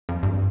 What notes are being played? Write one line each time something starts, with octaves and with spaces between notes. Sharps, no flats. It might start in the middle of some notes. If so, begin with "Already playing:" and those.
F2
G2